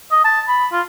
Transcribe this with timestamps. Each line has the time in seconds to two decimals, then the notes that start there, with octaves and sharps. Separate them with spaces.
0.11 D#5
0.24 A5
0.48 B5
0.72 F4